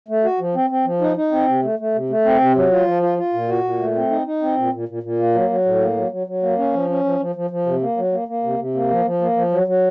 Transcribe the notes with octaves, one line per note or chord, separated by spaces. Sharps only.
A3
F#4
F3
C4
C4
F3
D#4
D#4
C4
C3
A3
A3
C3
A3
C4
C3
F#3
F4
F3
F4
F4
A#2
F#4
A#2
A3
C4
D#4
D#4
C4
A#2
A#2
A#2
A#2
A#3
F#3
F#3
A2
A#3
F#3
F#3
F#3
A#3
C#4
F3
C#4
F3
F3
F3
F3
C3
A#3
F#3
A#3
A#3
C3
C3
A#3
F3
F3
A#3
F3
F#3
F#3